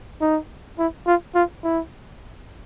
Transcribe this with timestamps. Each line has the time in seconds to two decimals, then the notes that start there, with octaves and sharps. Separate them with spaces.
0.21 D#4
0.78 E4
1.06 F4
1.35 F4
1.64 E4